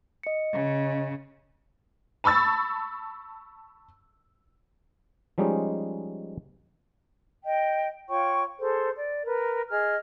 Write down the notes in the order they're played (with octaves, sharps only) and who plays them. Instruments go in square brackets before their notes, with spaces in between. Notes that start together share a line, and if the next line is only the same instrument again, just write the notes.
[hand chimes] D#5 C#7
[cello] C#3
[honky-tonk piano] A5 B5 C#6 E6 A6
[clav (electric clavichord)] F3 G3 G#3 C#4 D#4
[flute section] D#5 G5
F4 C#5 G5 C#6
G#4 A4 C5
D5
A#4 B4
G#4 D#5 F6